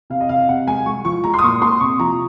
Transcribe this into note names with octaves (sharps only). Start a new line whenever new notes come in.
C3 F5
D#5
C3 F5
C3 F#5
G#3 G#5
G#3 C#6
F3 C#6
G#3 A#5
C6 D#6
A#2 C#6
A#2 C6
C3 C#6
F3 A#5